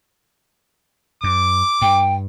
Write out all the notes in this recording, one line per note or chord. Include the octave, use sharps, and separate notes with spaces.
F#2 D6
G2 G5